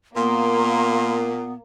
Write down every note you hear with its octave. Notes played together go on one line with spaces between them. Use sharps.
A#2 A#3 B3 C6